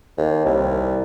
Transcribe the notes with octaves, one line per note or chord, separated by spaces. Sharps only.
D#2
C2